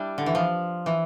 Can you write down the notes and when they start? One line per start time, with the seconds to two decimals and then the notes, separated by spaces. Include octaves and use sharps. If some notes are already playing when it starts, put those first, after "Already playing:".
Already playing: G3 D4 E4
0.18 D3
0.26 E3
0.35 F3
0.86 E3